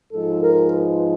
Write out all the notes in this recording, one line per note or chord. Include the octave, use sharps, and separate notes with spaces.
G#2 F3 G#3 A4
A#4
B4